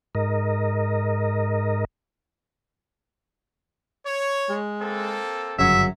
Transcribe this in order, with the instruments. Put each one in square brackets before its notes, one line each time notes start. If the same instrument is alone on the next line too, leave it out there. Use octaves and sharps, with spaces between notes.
[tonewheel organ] G#2 A#4 D#5
[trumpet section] C#5
[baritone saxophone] G#3
[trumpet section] A#3 C4 A4
[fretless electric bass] G1 F#2 C#3 [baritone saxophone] F#3 [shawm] E5